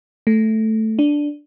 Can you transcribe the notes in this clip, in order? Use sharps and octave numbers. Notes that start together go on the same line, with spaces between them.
A3
D4